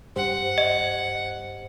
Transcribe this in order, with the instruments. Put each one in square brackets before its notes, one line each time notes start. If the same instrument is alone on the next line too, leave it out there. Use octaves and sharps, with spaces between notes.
[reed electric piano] G2 G4 C5 [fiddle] F#5
[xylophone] D#5